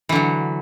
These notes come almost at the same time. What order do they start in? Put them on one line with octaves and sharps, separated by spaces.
E3 D3 F#3